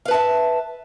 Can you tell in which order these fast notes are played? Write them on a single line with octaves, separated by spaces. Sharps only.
F5 B4 A5 E5